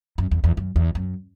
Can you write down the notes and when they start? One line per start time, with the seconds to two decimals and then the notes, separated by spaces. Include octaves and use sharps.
0.18 F#2
0.31 E2
0.44 E2
0.57 F#2
0.76 E2
0.95 F#2